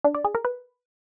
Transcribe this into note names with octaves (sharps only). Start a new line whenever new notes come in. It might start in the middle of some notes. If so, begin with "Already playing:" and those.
D4
D5
G#4
A#4
B4